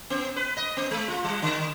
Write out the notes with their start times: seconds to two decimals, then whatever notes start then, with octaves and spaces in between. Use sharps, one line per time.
0.10 B3
0.36 B4
0.57 D#5
0.77 B3
0.91 G#3
1.08 F4
1.24 G3
1.42 D3